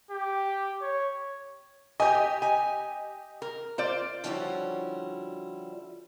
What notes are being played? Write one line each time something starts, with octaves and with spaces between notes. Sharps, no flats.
G4
C#5
G4 D#5 G#5
G#5
A#4
F4 C5 D5
D3 F3 G3 C#4 E4 F#4